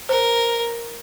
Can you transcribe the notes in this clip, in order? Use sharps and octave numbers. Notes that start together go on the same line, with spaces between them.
A#4 C5